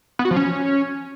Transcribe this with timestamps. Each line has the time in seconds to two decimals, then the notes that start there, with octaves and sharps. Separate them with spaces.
0.19 B3
0.25 F#4
0.31 F3
0.36 C#4